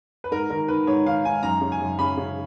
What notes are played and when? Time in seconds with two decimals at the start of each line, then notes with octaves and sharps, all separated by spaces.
0.24 B4
0.31 G#2 A#4
0.50 D#3 A#4
0.68 D#3 B4
0.87 G#2 C#5
1.05 D#3 F5
1.25 G#2 G#5
1.43 F#2 A#5
1.61 C#3
1.72 G#5
1.80 F#2
1.99 C#3 B5
2.17 C#3